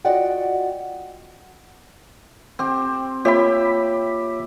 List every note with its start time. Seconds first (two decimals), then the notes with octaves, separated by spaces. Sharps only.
0.05 F4 F#4 D5 D#5 F#5 G5
2.59 C4 G4
3.25 A#3 F4 G4 C#5 E5 B5